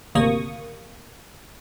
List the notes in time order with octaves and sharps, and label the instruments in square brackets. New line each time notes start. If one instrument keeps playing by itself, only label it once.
[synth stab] G#1 D2 C3 A#3 C#6 D#6